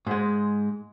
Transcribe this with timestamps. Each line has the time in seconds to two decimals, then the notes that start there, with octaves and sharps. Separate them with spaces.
0.07 G#2 G#3